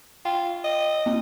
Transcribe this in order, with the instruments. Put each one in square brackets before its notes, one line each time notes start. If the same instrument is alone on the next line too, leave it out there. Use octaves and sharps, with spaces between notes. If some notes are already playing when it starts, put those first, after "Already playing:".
[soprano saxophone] F4 [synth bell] G5
[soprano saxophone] D#5
[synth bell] A#3 C4